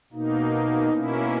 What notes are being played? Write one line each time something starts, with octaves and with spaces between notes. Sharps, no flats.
B2 A#3 D#4
B2 A#3 C#4 E4